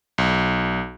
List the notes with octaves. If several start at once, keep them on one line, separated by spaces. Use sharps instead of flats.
B1